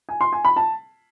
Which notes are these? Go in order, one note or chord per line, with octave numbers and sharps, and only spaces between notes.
G#5
C6
G#5
B5
A5